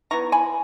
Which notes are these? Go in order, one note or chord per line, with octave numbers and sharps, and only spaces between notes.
B3 E4 A#5 C#6
G#5 B5